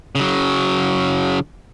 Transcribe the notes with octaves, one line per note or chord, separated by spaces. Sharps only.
C#3 F#3